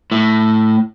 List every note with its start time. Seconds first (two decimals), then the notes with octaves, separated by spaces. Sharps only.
0.12 A2